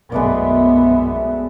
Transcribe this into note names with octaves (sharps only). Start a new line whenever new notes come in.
B1 F#2 G#3 A3 B3 D5
E5